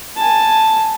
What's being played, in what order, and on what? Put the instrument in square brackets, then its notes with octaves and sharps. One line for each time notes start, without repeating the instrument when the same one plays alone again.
[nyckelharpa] G#5 A5